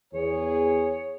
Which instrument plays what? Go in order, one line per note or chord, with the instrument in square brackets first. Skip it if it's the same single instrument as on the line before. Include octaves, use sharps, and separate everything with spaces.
[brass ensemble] E2 G#4 [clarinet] C#5